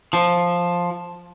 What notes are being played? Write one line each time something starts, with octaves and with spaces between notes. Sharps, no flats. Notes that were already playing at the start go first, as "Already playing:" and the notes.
F3